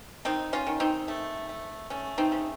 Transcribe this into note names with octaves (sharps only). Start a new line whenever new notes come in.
D#3 C4 D#4
C#4 F4
D#3
C4 D#4
A3
A3
A3 C#4
C4 D#4
C#3